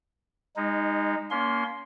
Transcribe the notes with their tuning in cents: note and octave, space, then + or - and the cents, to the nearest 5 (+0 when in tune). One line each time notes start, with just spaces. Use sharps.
G#3 -30 D#4 +0
A#3 +10 C#4 +35 C6 +0